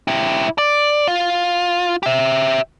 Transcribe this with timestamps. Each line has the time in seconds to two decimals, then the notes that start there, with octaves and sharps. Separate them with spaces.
0.08 E4 G4
0.58 D5
1.08 F4
2.03 G4 E5